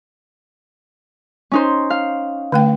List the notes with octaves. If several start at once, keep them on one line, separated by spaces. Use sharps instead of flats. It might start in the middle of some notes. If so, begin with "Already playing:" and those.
C#4 D#4 C5
F5
D3 A3 G5